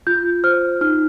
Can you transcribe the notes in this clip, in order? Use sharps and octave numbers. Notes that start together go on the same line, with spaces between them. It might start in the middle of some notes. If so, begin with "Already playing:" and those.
F4 G6
C5 F6
D#4 F6